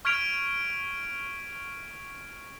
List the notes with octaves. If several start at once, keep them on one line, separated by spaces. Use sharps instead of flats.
C#6 F6 G#6 B6 D7 F7